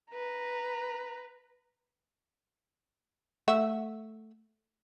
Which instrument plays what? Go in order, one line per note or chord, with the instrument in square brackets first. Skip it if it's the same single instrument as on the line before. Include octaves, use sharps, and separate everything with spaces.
[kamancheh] B4 A#5
[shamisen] A3 E5 F#5